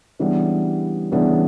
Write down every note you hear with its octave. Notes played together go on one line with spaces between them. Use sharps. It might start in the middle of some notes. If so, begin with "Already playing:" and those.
C#3 E3 G3 B3 D4
C#3 E3 G3 B3 D4